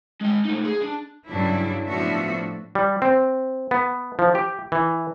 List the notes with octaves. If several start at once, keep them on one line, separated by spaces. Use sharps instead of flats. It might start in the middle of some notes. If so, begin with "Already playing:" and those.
G#3 G5
A3 D#4
G#4
D4
G2 C#3 F#3 D4 E4
A2 F3 B3 D4 F#4 E5
G3
C4
B3
F3
G4
E3